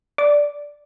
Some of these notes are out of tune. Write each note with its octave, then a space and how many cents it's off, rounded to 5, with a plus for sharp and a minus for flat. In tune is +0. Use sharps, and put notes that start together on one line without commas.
D5 -5